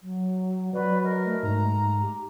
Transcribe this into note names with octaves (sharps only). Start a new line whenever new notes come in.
F#3
F#3 F#4 B4 D5
A#4 D#5
A3
G#2 A#5
G4